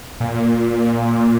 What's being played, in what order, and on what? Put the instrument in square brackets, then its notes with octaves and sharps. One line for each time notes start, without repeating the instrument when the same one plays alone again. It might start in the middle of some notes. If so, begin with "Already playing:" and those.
[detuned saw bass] A#2